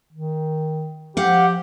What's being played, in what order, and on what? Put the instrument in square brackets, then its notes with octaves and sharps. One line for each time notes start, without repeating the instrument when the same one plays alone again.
[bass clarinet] D#3
[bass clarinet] F3 [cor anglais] G4 [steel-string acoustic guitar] F5 F#5